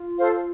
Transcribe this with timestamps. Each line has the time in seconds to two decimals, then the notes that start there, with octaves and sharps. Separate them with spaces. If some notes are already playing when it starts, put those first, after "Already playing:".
Already playing: F4
0.17 A4 C5 F5